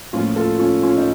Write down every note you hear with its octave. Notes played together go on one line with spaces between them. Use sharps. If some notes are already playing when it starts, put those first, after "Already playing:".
A2 F3 A#3 C#4 F4
F4 A4
C#4 F4
C#4 F4
D#4